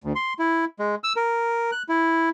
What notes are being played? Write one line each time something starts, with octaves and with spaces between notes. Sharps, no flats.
D2
C6
E4
G#3
E6
A#4
F#6
E4